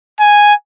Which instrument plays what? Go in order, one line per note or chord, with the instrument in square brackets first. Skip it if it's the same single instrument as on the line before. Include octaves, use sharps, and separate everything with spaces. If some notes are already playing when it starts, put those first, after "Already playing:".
[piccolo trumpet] G#5